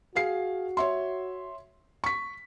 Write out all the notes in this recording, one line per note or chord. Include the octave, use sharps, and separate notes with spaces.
F#4 G#4 F5 C7
C#5 E5 C6
C#6 B6